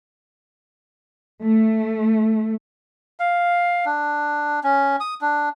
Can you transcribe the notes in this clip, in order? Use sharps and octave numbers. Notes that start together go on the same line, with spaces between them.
A3
F5
D4
C#4
D#6
D4